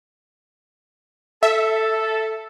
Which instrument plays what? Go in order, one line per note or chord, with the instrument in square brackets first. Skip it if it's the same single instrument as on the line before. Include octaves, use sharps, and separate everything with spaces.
[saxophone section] A4 [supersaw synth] E5